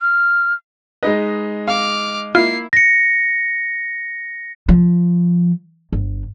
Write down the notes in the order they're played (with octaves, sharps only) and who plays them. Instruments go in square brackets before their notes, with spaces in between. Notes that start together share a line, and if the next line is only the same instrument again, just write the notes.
[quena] F6
[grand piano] G#3 D#4 D#5 [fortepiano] B4
[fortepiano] F5 [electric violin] D6 F6
[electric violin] A#3 C7 [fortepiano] E4 [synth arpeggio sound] F4
[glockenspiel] A#6 C#7
[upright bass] F3
G1